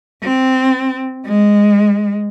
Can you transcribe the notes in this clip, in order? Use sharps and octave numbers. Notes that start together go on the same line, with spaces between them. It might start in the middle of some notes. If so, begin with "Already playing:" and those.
C4
G#3